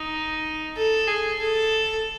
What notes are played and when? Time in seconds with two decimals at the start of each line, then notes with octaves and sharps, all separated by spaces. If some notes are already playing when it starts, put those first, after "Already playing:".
Already playing: D#4
0.77 A4
1.08 G#4
1.39 A4